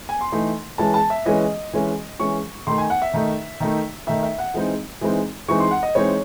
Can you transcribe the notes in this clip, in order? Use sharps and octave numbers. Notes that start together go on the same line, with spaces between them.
G#5
C6
E3 A3 D#4
E3 G#3 C#4 A5
A5
E5
E3 G#3 C#4 D#5
E3 G#3 C#4
E3 G#3 C#4 C#6
D#3 A3 D#4 C6
G#5
F#5
E5
D#3 A3 D#4
D#3 A3 D#4
D#3 A3 D#4 E5
E5
F#5
E3 G#3 C4 D#4
E3 G#3 C4 D#4
E3 G#3 C4 D#4 C#6
C6
F#5
D#5
E3 G#3 C4 D#4 C#5